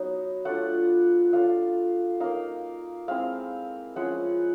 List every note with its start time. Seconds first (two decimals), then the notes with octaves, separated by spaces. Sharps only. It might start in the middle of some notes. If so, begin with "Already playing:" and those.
Already playing: F#3 B3 D#4
0.45 A3 D4 F4 F#5
1.33 A3 D4 F4 F5
2.20 A#3 D#4 F5
3.08 G#3 C4 E4 F5
3.96 F3 G#3 C#4 E4 F#5